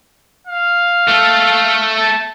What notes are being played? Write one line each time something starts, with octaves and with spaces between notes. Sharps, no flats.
F5
A3 A4
A5